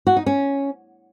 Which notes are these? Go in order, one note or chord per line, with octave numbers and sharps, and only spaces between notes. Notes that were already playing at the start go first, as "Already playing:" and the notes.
F#4
D#4
C#4